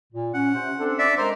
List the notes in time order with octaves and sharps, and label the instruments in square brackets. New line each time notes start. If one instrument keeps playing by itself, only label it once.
[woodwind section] A#2
[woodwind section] C#4 [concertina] F#5
[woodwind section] C3 C5
C4 D4 A4
[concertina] D5 E5
[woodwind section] G#3 A#4 A#5 [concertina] C5